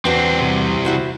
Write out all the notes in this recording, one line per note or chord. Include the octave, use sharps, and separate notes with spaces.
E2 C4 D4 F#4
C2 C3
E4 F#4 C5